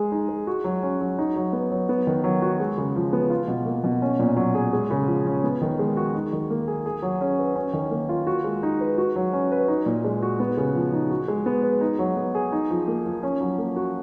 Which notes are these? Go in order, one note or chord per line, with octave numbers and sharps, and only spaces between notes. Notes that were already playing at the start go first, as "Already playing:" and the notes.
Already playing: G#3 G#4
D#4
G#3
F#4
F#3
C#4
F#3
D#4
F#3
B3
F#3
B3
D#3
F#3
F#4
G#3
C#3
F3
B3
F4
B2
A#3
B2
C#4
A#2
F#3
G#4
G#3
C#3
F3
C#4
B3
D#3
G#3
F#4
D#4
D#3
A#3
G#4
G#4
F#3
C#4
B4
C#4
D#3
A#3
F4
F#4
G#3
D#4
B4
F#4
F#3
C#4
B4
D#4
A#2
G#3
F#4
B3
C#3
F3
D#4
F#4
G#3
B3
B4
D#4
F#3
B3
G#4
D#4
F3
A#3
F3
C#4
F#3
A#3
F#4